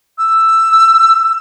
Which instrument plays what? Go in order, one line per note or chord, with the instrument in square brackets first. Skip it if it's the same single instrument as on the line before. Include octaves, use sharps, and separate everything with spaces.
[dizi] E6